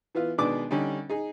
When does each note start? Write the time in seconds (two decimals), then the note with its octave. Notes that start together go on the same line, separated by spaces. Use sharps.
0.15 E3 B3 F4
0.38 B2 D#3 G#3 D4 B4 D6
0.71 D3 G3 C#4 D#4
1.09 D#4 G#4